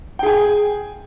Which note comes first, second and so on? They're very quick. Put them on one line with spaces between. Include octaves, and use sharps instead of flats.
G5 G#4 G#5